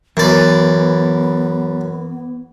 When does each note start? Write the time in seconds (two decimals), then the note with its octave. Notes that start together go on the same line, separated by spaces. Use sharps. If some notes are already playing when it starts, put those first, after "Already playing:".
0.17 F#2 E3 B3 D5